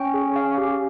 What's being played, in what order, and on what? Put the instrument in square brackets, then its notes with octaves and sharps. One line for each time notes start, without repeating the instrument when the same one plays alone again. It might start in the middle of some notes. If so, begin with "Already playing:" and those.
Already playing: [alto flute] C#4 [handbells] G5
[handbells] G#4
F5
G4